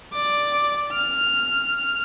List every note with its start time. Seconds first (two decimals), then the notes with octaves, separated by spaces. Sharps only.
0.13 D5 D6
0.93 F6